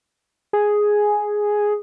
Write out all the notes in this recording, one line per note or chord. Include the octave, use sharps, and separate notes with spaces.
G#4